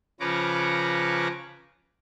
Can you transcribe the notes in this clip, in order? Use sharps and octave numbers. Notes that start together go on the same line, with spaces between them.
C#3 F3 B4 C#5 A#5 D6